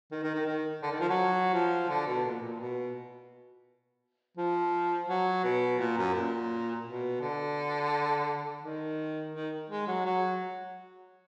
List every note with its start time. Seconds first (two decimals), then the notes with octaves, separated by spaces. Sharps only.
0.12 D#3
0.23 D#3
0.35 D#3
0.47 D#3
0.83 D3
0.91 D#3
1.00 F3
1.09 F#3
1.53 F3
1.89 D3
2.07 B2
2.24 A#2
2.42 A#2
2.60 B2
4.37 F3
5.09 F#3
5.44 B2
5.79 A#2
5.97 F#2
6.15 A#2
6.86 B2
7.21 D3
8.63 D#3
9.34 D#3
9.70 G#3
9.88 F#3
10.06 F#3